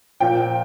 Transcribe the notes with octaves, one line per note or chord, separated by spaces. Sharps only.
A#2 F3 G5